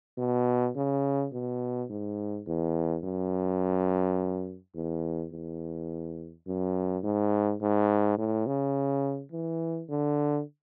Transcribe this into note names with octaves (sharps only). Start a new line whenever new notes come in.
B2
C#3
B2
G#2
E2
F#2
E2
E2
F#2
G#2
G#2
A2
C#3
E3
D3